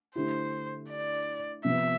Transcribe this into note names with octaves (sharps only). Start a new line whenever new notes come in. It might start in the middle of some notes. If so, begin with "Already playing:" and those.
D3 A3 E4 G4 C5
D5
C3 F3 B3 E5